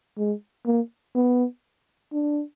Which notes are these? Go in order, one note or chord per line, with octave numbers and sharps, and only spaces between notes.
G#3
A#3
B3
D4